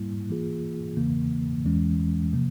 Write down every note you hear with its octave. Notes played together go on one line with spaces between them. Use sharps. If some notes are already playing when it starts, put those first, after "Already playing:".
Already playing: G#2 G3 A#3 E4
E3 A#3 F4 G#4
E2 C#3 E3 A#3
E2 E3 G#3 C#4
C3 F3 A#3